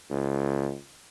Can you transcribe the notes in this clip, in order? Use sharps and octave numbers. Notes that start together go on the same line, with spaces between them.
C#2